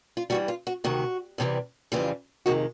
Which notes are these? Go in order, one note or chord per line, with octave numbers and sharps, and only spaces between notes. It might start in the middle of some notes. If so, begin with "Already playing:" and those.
F4
G2 E3 G3 F#4
F4
F#4
D2 C3 D#3 F#4
E2 C3 E3 G3
F2 C#3 E3 G3 F4
F2 C3 D#3 G#3 F#4